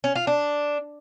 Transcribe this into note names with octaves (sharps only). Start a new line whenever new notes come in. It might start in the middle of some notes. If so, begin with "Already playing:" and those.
C#4
F4
D4